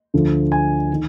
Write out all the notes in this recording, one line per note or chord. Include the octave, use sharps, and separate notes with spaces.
D2 D3 F3
G#5
D#3